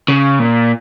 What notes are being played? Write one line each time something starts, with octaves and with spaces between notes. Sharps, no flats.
C#3
A#2